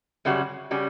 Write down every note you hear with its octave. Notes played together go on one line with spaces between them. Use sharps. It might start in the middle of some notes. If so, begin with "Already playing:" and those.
F#2 C#3 G3 C#4 F#4
C#3 G3 C#4 F#4